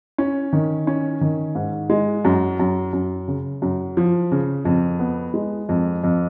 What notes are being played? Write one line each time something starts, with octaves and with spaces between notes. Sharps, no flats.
C#4
D#3
C#4
D#3
G#2
G#3
F#2
F#2
F#2
C#3
F#2
F3
C#3
F2
B3
G#3
F2
F2